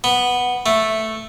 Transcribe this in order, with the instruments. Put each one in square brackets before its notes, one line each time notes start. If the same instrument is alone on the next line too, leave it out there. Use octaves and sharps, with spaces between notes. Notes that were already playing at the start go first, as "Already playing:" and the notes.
[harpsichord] B3
A3